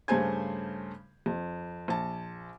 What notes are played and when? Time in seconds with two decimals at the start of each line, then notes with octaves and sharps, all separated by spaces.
0.08 G2 C#3 A3 C5 G#5 G#6
1.26 F2
1.88 A#1 A5